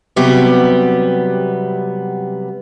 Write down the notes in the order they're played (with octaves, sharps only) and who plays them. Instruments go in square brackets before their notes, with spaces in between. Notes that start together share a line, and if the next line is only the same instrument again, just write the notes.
[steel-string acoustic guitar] C3 F#3 G3 B3 G4